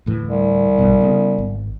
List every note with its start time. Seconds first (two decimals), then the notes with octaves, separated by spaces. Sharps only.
0.06 D2 A2 E3
0.28 C2
0.78 A#1 G2 B2
1.01 C#3 A#3 B3
1.38 G#1